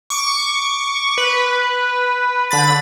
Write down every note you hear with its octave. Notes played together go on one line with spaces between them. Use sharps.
C#6 D6
B4
D3 B5 A6